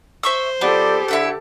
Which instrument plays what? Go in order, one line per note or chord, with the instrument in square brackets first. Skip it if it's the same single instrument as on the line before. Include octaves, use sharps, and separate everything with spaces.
[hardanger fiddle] C5 [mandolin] E5 C#6 E6
[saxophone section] F3 D5 [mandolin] B3 [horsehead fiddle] G4 A4
[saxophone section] D3 [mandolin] E4 E5 F#5